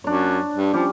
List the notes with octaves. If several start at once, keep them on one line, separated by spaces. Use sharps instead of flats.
F#2 D4 C#5
G2
F3 G3 C#4 G4